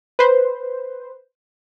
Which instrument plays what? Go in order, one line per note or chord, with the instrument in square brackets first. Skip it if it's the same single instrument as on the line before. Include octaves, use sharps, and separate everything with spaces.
[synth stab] B4 C5